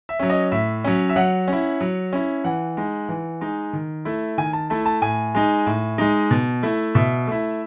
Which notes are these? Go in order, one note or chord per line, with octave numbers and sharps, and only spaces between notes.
E5
F#3 C#4
D#5
A2 E5
F#3 C#4
E5
F#3 F#5
C#4 E4
F#3
C#4 E4
E3 F#5
G#3 D#4
E3
G#3 D#4
D#3
A3 E4
D#3 G#5
A5
A3 E4 A5
A5
A2 G#5
G#3 D#4
A2
G#3 D#4
B2
A3 E4
B2 E5
A3 E4